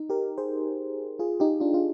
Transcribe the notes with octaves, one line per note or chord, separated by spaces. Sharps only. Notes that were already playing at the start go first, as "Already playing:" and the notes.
Already playing: D#4
G4 A#4
G#4 C5
F4 G#4
D#4 G4
D4 F4
F4